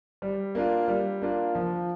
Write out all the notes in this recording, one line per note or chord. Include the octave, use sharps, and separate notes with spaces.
G3
A#3 D4 F4
G3
A#3 D4 F4
F3